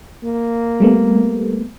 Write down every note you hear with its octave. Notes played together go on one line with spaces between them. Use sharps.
A#3
G3 A3 B3